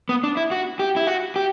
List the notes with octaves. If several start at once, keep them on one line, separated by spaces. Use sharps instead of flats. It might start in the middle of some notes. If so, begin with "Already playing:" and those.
B3
D4
E4
F#4
G4
E4
F#4
G4